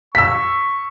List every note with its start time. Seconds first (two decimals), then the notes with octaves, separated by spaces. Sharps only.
0.15 C#6 E6 B6